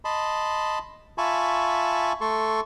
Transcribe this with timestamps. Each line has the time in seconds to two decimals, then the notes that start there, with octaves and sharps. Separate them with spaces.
0.05 D#5 A5 B5 C6
1.18 F4 E5 G#5 A5 B5 C#6
2.21 A3 A4 C6 C#6